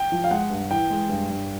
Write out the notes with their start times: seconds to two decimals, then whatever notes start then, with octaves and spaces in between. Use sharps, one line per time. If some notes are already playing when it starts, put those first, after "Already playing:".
Already playing: G5
0.12 F3
0.24 F5
0.31 G#3 F#5
0.50 G2
0.70 E3 G5
0.90 G#3
1.09 G2
1.30 G2